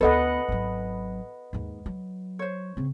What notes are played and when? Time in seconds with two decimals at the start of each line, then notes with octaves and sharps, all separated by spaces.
0.01 D2 B3 A4 B4 D#5 F#5
0.49 G#1 F#3
1.53 D#2 G#2
1.86 F#3
2.39 C5 C#5
2.77 C#3 C4